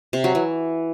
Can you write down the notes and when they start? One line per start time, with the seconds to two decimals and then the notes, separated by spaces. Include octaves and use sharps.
0.13 C3
0.24 F#3
0.35 E3